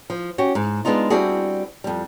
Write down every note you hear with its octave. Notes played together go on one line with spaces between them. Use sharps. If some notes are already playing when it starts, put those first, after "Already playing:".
F3
C#4 F#4 G4
G#2
G#3 B3 D4 D#4 F4
G3 C4 D4 E4 F#4 G#4
F2 G3